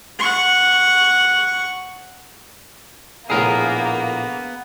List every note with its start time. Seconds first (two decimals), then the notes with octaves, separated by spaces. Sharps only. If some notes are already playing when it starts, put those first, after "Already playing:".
0.19 F#5 C#6
3.30 A#1 A2 A#3 B3 G#4 A#4